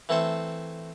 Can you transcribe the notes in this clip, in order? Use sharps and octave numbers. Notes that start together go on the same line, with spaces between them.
E3 A3 C4 A4 C5